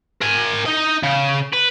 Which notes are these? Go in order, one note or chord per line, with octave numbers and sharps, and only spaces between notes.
A#4 G#5
D#4 D#5
C#3
B4